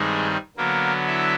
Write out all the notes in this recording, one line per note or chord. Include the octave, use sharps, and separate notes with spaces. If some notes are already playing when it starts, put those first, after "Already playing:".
Already playing: G2 D#3 G3 G#3 C4 D#4 G#4
D3 F#3 A#3 B3 A#4
E4 E5